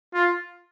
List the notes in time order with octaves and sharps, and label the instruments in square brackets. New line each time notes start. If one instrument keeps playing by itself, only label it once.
[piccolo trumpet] F4